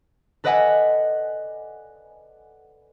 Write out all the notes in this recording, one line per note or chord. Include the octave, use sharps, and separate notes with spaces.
A4 B4 D5 D#5 F#5 G#5